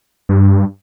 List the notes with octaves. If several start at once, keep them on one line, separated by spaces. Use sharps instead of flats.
G2